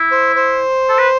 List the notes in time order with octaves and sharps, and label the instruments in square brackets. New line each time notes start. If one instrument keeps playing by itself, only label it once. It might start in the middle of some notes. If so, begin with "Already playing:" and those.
Already playing: [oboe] E4
[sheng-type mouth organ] C5
C5
[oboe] A4
B4